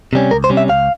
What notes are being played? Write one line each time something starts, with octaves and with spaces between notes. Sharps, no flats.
C3 G3 C#4
C#2 A#4
C5
C3 G3 C#4
E5
C#2 F5